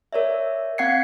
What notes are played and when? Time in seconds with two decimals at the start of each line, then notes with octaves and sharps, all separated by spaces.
0.13 A#4 C#5 D5 E5
0.78 C4 F5 F#5 G#6 C7 C#7